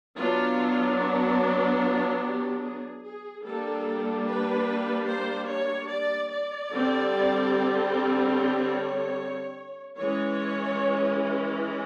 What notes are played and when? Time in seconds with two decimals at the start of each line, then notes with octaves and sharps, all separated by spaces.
0.17 F#3 B3 D4 F4
1.00 F#4
1.80 F4
2.22 G4
2.62 G#4
3.03 G#4
3.44 G3 A#3 D4 A4
4.26 B4
5.08 C5
5.48 C#5
5.89 D5
6.30 D5
6.71 D3 G3 C4
8.34 C#5
9.97 E3 G#3 C#4 C#5